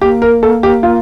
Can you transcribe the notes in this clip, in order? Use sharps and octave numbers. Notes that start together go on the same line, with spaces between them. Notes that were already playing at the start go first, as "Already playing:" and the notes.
A#3 G4
A#4
A4
G4
F4